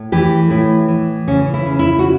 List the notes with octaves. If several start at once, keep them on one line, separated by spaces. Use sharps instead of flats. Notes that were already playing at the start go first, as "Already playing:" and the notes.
Already playing: A2
E3 G4
A2 E4
E3
C#3 C#4
E4
C#3
E4
F#4